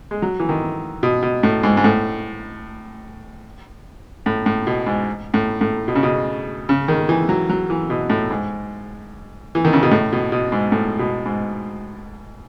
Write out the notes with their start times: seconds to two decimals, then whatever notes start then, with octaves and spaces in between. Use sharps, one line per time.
0.11 G#3
0.22 F#3
0.40 E3
0.49 D#3
1.03 B2
1.22 B2
1.43 A2
1.63 G#2
1.77 G#2
1.84 A2
4.26 A2
4.46 A2
4.67 B2
4.87 G#2
5.34 A2
5.61 A2
5.88 B2
5.95 C#3
6.03 B2
6.69 C#3
6.88 D#3
7.09 E3
7.29 F#3
7.50 F#3
7.70 E3
7.90 B2
8.10 A2
8.31 G#2
9.55 E3
9.65 D#3
9.73 C#3
9.83 B2
9.91 A2
10.12 B2
10.32 B2
10.52 G#2
10.72 A2
10.99 B2
11.26 G#2